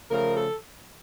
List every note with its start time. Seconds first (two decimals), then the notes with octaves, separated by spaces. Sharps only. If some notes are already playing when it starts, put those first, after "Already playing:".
0.11 C#3 F3 A3 A#4
0.36 A4